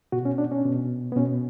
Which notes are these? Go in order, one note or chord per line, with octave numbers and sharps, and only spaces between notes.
B2 F#4
C#4
D4
C#4
B2
B3
B2 C#4